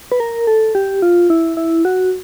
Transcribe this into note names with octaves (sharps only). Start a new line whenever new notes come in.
B4
A#4
A4
G4
F4
E4
E4
F#4